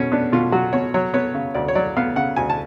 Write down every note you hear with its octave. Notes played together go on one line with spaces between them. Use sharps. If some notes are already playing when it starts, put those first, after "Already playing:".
Already playing: B2 C#4
B3 D4
B2 F4
F#3 F#4
B2 C#5
F#3 C#5
B3 C#5
C#3
D2 D5
C#5
F#3 D5
B3 F5
C#3 F#5
D2 G#5
A5